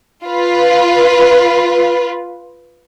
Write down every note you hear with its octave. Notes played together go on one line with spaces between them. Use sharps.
F4 B4